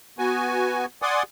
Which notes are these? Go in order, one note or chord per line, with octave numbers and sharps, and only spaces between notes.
B3 F#4 G#5
D5 F#5 G#5 C6 D6 D#6